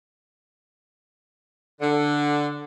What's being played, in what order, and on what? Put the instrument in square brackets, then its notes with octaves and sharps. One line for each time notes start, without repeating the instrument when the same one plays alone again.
[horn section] D3